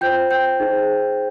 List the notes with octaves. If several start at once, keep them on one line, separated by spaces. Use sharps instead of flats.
F4 C5 G5 G6
G5 G6
D#4 G#4 C5